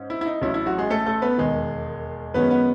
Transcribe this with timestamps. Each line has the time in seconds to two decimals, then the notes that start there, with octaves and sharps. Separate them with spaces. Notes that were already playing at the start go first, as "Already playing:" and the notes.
Already playing: G#2 C#4
0.10 E4
0.21 E4
0.26 D#4
0.42 A1 A2 F#3 C#4 E4
0.54 E4
0.66 F#3 F#4
0.78 G#3 G#4
0.90 A3 A4
1.06 A3 A4
1.22 B3 B4
1.38 E1 D#2 D#3 G#3 G#4
2.34 F#2 D#3 G#3 B3 C#4 B4
2.50 B3 B4